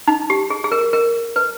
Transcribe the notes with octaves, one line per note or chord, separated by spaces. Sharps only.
D#4
G4
G#4
G#4
A#4
A#4
B4